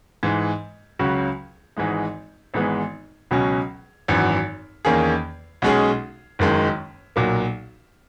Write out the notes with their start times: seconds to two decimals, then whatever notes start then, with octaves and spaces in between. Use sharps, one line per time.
0.23 G#2 E3 G#3
0.99 C#2 C#3 F#3 C#4 F#4
1.77 G#1 G#2 E3 G#3 D#4
2.54 G#1 G#2 E3 G#3 B3
3.31 C#2 B2 F#3 C#4
4.08 G#1 F#2 E3
4.85 E2 D#3 A#3 C#4 G#4
5.62 B1 B2 G#3 C#4 G#4
6.39 F#1 F#2 D#3 G#3
7.16 B1 A#2 F#3 A#3